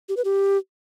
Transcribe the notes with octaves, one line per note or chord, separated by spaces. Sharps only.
G4
B4
G4